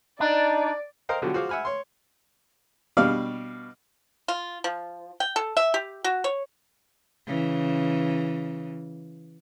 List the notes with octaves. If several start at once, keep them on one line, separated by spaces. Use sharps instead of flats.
D4 D#4 D5
A#4 C5 D#5 F5 G5
B2 D3 F3 F#3 F#4 G4
F4 F#4 G#4 C5 F5 D6
E5 F#5 G#5 B5 F6
C#5 C6
B2 G3 D4 D5 F5 F6
F4
F3
G5
A4
E5
G4
F#4
C#5
C#3 E3